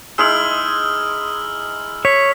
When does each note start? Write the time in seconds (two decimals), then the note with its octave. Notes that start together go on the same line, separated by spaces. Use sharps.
0.18 G#3 D#4 E4 E6 F6 F#7
2.05 C#5 B6